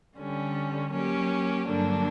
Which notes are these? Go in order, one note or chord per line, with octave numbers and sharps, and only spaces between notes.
D3 G3 C#4
F#3 A#3 C#4 G4
G2 D3 F#3 A#3 D4